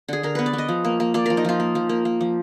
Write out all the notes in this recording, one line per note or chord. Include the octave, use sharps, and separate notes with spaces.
D3 G#4
D3 A#4
B3 B4
D5
B3 D#5
F3
A#3
A#3
A#3 D5
F3 A#4
D#4
F3 F4
A#3
F3
A#3
A#3
F3